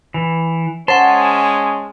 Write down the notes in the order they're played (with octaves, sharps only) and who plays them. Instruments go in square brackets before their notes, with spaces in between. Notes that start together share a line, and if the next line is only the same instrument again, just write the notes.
[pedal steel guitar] E3
[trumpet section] G#3 C#4 [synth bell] C5 F#5 E7 [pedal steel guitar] A5 C6